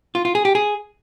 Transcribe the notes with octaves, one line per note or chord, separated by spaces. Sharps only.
F4
F4
G#4
G4
G#4